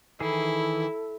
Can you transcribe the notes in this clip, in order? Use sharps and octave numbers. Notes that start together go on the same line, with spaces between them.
D#3 E3 E4 G#4 A4